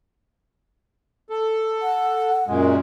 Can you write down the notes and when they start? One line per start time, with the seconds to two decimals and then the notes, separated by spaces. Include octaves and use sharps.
1.30 A4
1.82 F#5
2.47 F#2 A#2 G#3